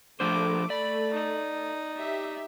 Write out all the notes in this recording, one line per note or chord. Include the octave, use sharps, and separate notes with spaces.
F3 A3 D4 C5 D6
D5 B5
D#4
G4 E5